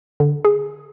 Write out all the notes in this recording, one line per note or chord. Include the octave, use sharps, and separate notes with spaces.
D3
G#4